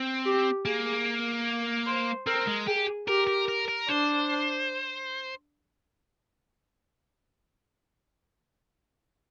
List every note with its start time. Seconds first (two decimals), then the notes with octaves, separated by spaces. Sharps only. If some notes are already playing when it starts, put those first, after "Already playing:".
Already playing: C4
0.25 G4
0.65 A#3 G#4
1.86 C5
2.27 C4 A#4
2.47 G#3
2.67 G4 G#4
3.07 G4 A#4
3.27 A#4
3.48 A#4
3.68 A#4
3.88 D4 C5